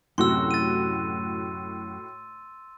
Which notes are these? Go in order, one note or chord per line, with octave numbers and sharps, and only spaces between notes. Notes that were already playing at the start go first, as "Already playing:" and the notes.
F#2 A2 C3 F#4 C6 E6
A6 D#7